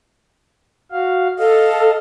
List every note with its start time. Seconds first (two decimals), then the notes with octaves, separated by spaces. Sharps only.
0.91 F#4 F5
1.39 A4 D#5 F5